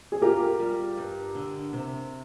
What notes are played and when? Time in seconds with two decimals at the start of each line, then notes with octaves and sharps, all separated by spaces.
0.12 G#4
0.22 F4 G4 A#4
0.59 G3
0.97 G2
1.35 D3
1.72 C3